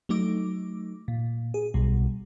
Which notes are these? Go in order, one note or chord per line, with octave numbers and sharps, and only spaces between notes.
F#3 A3 D#4 D6
A#2
G#4
B1 B2 G3